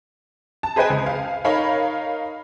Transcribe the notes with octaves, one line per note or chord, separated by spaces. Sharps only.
A5
G#4 B4 C5 D#5 G5 G#5
C#2
F5
D#4 A#4 C#5 F5 B5